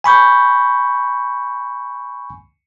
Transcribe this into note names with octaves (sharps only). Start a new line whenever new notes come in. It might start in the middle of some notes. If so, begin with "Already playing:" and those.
G#5 B5 C#6 G6